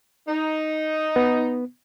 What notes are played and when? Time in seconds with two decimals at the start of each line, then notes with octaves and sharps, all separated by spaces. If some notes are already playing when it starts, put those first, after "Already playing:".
0.28 D#4
1.16 B3